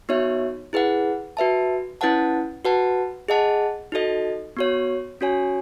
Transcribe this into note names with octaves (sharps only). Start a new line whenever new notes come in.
B3 D#4 F#4 C#5 E5
E4 G#4 B4 F#5
F#4 B4 E5 A5
C#4 E4 B4 F#5 A5
F#4 B4 F#5 A5
G#4 D#5 F#5 A5
D#4 F#4 A4 D#5
B3 F#4 C#5
C#4 F#4 C#5 G#5